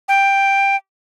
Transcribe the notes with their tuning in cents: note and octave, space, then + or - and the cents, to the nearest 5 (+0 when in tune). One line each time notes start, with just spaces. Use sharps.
G5 +10